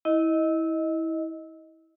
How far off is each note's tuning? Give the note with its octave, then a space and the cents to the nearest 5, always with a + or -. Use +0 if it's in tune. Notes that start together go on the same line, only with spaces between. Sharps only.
E4 -20 D#5 +10